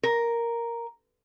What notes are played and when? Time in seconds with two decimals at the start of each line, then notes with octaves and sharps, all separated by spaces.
0.03 A#4